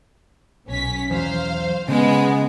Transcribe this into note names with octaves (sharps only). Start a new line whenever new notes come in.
B1 C#4 B6
E2 F#3 C5 F5
C#3 G#3 B3